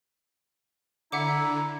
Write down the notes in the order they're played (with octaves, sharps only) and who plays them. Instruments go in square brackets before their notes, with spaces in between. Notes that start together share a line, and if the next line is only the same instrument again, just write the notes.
[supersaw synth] D3 [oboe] E4 [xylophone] E5 F#5 D6 [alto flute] A#5